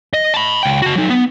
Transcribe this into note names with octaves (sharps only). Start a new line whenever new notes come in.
D#5
A5 B5
C#2 G5
F#4 A5
F#3 D#4
B3